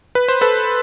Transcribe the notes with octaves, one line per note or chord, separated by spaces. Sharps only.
B4
C5
A4 B4